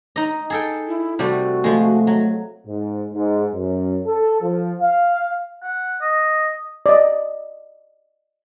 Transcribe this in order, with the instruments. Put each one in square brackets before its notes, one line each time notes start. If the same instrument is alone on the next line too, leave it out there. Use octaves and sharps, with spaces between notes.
[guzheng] D#4 D#5
G#4 A4 G5
[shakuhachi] E4
[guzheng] C3 G3 A3 [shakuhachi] F#4
[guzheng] F3 G#3 [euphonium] A3
[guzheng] F#3
[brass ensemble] G#2
G#2
F#2
A4
F3
F5
[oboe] F#5
D#5
[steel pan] D5 D#5